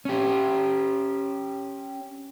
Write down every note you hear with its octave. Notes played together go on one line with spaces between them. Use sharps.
C#4 G4